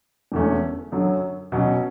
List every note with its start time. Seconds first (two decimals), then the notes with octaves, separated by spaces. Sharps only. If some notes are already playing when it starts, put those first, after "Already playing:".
0.32 E1 E2 D3 A3 C#4
0.92 F#2 D3 F#3
1.52 B2 F#3 C#4